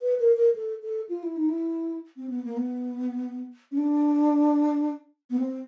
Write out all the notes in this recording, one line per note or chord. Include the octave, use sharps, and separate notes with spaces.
B4
A#4
A#4
A4
A4
F4
E4
D#4
E4
C4
B3
A#3
B3
C#4
D4
B3
C4